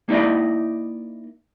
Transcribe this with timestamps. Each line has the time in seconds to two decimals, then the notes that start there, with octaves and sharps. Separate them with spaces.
0.09 A#3 D#4 E4 D5 D#5